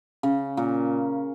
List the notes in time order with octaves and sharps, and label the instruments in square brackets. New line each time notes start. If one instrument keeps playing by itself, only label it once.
[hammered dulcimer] C#3
A#2